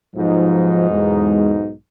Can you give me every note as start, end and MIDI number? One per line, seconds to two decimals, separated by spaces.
0.16 1.71 35
0.16 1.71 44
0.16 0.89 53
0.16 1.71 63
0.90 1.54 40
0.90 1.54 56